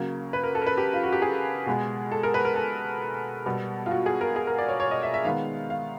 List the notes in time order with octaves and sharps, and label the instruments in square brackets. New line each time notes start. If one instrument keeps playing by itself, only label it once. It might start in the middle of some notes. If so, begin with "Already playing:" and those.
Already playing: [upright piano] C#3 F#3 A#3
B4
A#4
A4
A#4
B4
G4
F4
F#4
G4
G#4
B2 G#3 B3
A4
A#4
B4
A#4
A4
B2 G3 B3
F4
F#4
G#4
A#4
G#4
A#4
D5
C#5
C#5
D#5
E5
E5
D#3 G#3 B3 F5
F5